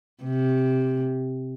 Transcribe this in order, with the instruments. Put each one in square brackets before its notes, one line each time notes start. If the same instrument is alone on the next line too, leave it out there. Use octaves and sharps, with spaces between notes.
[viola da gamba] C3